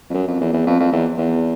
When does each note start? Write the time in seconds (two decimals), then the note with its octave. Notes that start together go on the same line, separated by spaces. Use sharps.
0.10 F2
0.14 F#2
0.28 F2
0.40 E2
0.53 E2
0.67 F2
0.80 F2
0.92 E2
1.18 E2